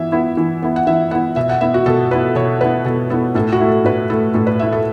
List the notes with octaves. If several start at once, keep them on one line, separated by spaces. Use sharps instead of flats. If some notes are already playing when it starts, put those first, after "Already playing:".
Already playing: E3 B3 E4 E5
B3 E4
E3
B3 E4
F#5
E3 E5
B3 E4 F#5
B2 E5
F#5
B3 E4 E5
F#4
B2 A4
B3 E4 B4
B2 C#5
B3 E4 B4
B2 A4
B3 E4 A4
A2 A4
F#4
A3 E4
A4
A2 B4
A3 E4 A4
A2 A4
B4
A3 E4 E5
A4